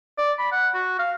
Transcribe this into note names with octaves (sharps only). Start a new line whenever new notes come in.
D5
B5
F#5
F#4
F5